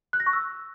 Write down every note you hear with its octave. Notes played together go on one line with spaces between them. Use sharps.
F#6
A#6
C#6
E6